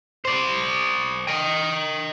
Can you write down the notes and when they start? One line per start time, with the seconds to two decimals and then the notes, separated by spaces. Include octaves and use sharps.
0.25 C5 D5
1.27 D#5 G5